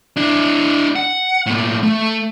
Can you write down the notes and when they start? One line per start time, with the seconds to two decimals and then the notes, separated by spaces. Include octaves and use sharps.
0.17 D4 E4
0.96 F#5
1.46 A2 A#3
1.83 A3